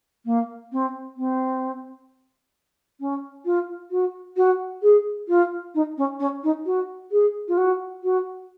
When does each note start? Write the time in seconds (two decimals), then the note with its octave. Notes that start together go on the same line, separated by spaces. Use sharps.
0.26 A#3
0.72 C4
1.17 C4
3.00 C#4
3.45 F4
3.91 F#4
4.37 F#4
4.83 G#4
5.28 F4
5.75 D#4
5.98 C#4
6.20 C#4
6.44 D#4
6.66 F#4
7.12 G#4
7.48 F4
7.58 F#4
8.04 F#4